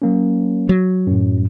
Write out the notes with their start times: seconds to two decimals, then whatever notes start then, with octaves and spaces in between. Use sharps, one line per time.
0.02 F#3 A#3 C#4
0.69 F#3
1.07 F#2 A2